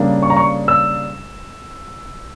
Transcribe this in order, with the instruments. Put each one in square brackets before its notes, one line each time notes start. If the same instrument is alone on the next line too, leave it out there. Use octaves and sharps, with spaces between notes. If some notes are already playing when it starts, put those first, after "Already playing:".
Already playing: [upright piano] C#3 G3 A#3 D4
C#6
A#5
C#6
E6